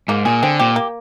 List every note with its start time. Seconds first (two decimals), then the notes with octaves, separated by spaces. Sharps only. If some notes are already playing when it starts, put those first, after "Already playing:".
0.08 G#2 A#3
0.25 A#2 G#4
0.42 D3 C4
0.59 A#2 G4
0.76 A#3